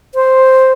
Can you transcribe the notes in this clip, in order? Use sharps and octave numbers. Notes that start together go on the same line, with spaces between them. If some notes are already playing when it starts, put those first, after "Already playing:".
C5